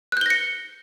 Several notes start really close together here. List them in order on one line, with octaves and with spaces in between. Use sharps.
F#6 G6 G7 A#6 C#7